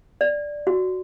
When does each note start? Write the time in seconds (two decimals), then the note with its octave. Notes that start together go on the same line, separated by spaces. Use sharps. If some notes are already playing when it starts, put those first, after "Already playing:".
0.21 D5
0.67 F#4